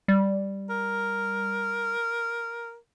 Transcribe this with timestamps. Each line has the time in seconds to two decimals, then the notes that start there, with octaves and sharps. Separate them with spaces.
0.08 G3
0.70 A#4